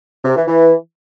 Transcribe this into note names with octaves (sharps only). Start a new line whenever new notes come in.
C3
E3
E3